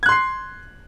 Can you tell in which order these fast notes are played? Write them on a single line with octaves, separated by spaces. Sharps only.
G#6 F#6 C6 C7